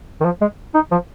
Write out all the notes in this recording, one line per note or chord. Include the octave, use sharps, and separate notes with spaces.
D#3
F3
G#3
D#4
F3